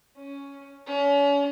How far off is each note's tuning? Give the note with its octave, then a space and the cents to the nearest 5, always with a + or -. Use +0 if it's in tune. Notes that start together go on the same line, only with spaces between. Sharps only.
C#4 +5
C#4 +35